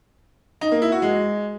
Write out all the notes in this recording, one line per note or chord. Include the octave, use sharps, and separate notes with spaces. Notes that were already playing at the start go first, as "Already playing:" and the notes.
D#4
A#3
E4
F#4
G#3